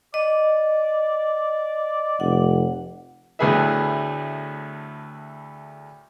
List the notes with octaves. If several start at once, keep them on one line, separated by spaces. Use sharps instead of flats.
D5 D#5
F1 F#5
D2 A2 B3 G#4 B4 E5